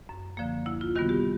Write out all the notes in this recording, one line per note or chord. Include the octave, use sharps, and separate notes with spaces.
F#2
D3 F3 A#3
D2 E4
F4
C3 D#3 G3 B3 F#4
G4